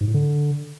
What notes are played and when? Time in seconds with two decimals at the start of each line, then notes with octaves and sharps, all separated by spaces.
0.01 G#2
0.07 A2
0.14 D3